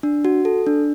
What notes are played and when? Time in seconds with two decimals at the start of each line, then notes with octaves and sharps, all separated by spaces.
0.03 D4
0.25 F#4
0.45 A4
0.67 D4